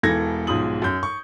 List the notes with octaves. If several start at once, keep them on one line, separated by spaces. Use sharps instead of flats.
E1 E3 A4 G#6 A#6
B1 G#2 F3 D#6 F#7
F#2 G6
C#6